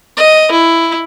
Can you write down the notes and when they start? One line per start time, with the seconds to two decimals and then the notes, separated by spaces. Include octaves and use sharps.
0.17 D#5
0.52 E4